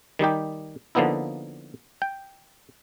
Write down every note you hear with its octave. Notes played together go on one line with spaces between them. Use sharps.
D#3 G3 D#4 G4
D3 F3 A#3 B3 D#4 E4
G5